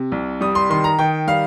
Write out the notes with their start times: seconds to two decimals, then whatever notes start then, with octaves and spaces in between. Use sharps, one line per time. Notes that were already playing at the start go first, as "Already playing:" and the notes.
Already playing: C3
0.12 C2
0.41 G3 D#6
0.55 C6
0.70 D#3 C6
0.84 A#5
0.99 D#3 G5
1.27 G3 F5